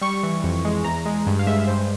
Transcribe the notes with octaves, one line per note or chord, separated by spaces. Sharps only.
G3 C#6
E3
F2
G#3
E2 A#5
G#3
G2
F5
G#3 E5
G2 C5